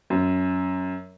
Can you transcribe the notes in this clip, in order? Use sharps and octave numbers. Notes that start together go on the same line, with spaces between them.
F#2